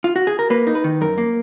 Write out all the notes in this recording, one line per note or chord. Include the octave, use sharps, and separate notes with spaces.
F4
F#4
G#4
A#4
A#3 B4
D#4
B4
D#3
F#2 A#4
A#3